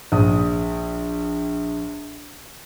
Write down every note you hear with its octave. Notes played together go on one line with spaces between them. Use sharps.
A#1 D#6